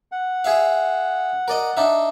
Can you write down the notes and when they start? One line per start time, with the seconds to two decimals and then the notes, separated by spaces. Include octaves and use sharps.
0.12 F#5
0.44 G#4 E5 F5
1.48 A#4 D5 D#5
1.77 D4 D#4 E5